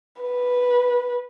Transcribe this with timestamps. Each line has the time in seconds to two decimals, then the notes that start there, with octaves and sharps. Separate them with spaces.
0.22 B4